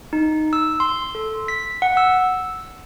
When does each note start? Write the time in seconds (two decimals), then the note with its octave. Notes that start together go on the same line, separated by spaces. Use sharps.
0.13 D#4
0.53 E6
0.80 C6
1.15 A4
1.48 B6
1.82 F#5
1.97 E6